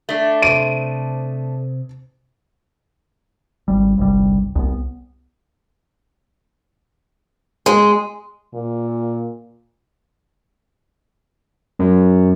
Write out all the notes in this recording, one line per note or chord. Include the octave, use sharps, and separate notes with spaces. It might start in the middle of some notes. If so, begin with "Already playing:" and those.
A3 D4
C3 C5 C6 D7 D#7
G#1 G3
G1 C2 C#3 G3
C2 B3
G#3
A#2
F#2